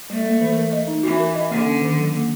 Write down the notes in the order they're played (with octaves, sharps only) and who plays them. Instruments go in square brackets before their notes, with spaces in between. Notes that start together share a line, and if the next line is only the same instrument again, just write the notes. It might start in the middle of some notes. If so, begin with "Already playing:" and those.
[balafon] G3 [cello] A3
[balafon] A#3
E3
A#4
D#5
D#4
[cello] E3 [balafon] F#4
[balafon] A#4
D#5
[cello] D3 [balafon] A#3
[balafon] C#4
D#3
F#3
A#3